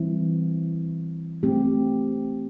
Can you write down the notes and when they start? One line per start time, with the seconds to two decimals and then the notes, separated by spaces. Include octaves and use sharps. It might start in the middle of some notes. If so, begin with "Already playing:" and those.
Already playing: E3 G3 C4 E4
1.43 A3 C4 G4